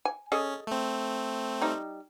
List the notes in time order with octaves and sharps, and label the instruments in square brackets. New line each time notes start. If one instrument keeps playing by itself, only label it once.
[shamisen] G#5
[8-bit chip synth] C#4 [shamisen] G#4 A4 D#5
[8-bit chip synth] A3 C4
[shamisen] G3 D#4